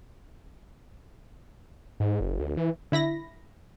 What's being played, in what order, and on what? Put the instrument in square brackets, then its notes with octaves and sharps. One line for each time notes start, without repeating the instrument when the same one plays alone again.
[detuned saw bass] G#2
F#1
D2
E3
[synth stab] D3 E4 B5 A#6